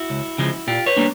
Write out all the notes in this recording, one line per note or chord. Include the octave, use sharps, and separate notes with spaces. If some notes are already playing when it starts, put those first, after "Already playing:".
Already playing: E4 F#4
C#2
C#3 F3 G#3
A#2 F4 G4
B4 C#5
G3 A#3 D4